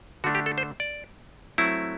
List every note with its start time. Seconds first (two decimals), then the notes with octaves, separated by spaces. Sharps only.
0.24 D3 A3 D4 F#4
0.35 G4
0.46 A4
0.58 C5
0.80 D5
1.58 F#3 A3 C4 E4